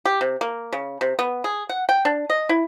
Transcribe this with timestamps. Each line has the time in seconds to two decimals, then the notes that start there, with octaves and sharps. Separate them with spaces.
0.05 G4
0.21 C3
0.41 A#3
0.73 C#3
1.01 C3
1.19 B3
1.44 G#4
1.69 F#5
1.89 G5
2.05 D4
2.30 D#5
2.49 E4